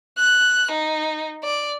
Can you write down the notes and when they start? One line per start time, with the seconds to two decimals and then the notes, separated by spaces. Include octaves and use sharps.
0.18 F#6
0.71 D#4
1.44 D5